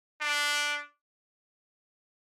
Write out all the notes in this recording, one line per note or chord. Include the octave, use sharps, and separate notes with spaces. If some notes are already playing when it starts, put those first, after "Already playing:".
D4